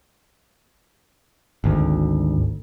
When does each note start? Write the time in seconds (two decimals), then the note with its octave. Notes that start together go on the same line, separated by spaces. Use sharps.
1.64 G#1 D2